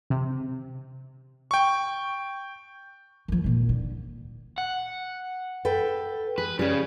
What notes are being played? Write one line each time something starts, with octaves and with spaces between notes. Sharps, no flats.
C3
G5 C#6
D#3 F3
A#2 D#3
D3
F#5
A4 B4 G5
G#4 B4
C#3 G3 C#4 G#4